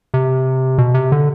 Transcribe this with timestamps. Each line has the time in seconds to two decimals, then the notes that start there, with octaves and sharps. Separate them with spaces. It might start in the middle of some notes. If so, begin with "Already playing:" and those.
0.14 C3
0.78 B2
0.95 C3
1.12 D3